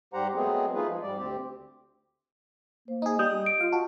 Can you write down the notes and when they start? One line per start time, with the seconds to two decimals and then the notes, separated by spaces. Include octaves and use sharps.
0.13 G#2 G3 G4 C5 F#5 A#5
0.35 F#3 G#3 A3 B3 C4 G#4
0.74 G#3 A3 D#4 F4 G#4 B4
0.87 F3
1.03 G#2 G3 D5
1.17 D2 C4 G4
2.88 A#3 C5
3.02 D#4 G#4 D#5
3.19 G3 D#6 G6
3.46 D7
3.60 F4 F5
3.72 F#4 A5